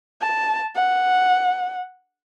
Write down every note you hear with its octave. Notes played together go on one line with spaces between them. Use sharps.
A5
F#5